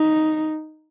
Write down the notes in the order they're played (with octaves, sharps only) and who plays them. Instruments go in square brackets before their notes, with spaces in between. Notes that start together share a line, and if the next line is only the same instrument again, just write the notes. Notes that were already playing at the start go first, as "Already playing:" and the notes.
Already playing: [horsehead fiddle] D#4